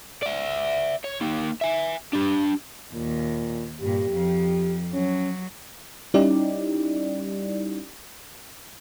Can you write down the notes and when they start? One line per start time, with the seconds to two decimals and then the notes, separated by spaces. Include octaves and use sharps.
0.22 D5 E5
1.04 C#5
1.21 A#3 D#4
1.61 E5 G#5
2.13 D4 G4
2.93 D#2 A#2
3.81 G2 A#2 G4
4.11 F2 F3
4.93 F#3 C#4
6.14 G3 C#4 D#4 E4 G4 D5